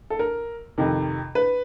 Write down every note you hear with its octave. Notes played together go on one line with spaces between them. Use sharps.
A4
A#4
F2 C3 D#3
B4